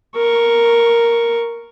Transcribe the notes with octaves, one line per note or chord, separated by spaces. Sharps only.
A#4 C#6